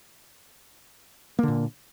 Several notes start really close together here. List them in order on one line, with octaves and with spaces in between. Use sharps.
A#3 D3 A#2